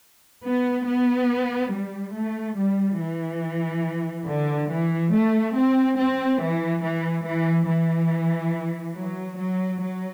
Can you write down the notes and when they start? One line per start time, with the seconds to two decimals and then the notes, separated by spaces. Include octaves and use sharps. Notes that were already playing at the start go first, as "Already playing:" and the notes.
0.44 B3
0.87 B3
1.72 G3
2.15 A3
2.57 G3
3.00 E3
4.28 D3
4.70 E3
5.13 A3
5.55 C4
5.98 C4
6.40 E3
6.83 E3
7.26 E3
7.68 E3
8.96 F#3
9.39 F#3
9.81 F#3